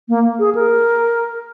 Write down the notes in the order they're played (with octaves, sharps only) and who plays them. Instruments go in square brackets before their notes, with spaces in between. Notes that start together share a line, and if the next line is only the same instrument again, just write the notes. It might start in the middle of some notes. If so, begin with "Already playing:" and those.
[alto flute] A#3
G#4
A#4